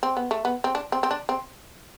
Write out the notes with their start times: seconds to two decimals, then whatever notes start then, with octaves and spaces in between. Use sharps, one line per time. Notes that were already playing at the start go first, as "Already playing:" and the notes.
0.03 C4
0.17 B3
0.31 A3
0.45 B3
0.64 C4
0.75 D4
0.92 C4
1.03 C4
1.11 D4
1.29 C4